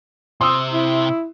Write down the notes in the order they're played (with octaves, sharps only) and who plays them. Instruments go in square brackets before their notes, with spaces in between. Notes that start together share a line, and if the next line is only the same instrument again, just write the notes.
[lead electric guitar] C3 C5 [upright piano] C6 D#6 E6
[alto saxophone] E4